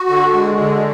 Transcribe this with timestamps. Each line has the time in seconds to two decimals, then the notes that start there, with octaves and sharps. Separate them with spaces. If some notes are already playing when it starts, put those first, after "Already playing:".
Already playing: F#4
0.09 D3
0.33 G#3
0.59 D3